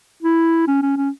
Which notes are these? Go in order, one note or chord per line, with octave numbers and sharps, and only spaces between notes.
E4
C#4
C#4
C#4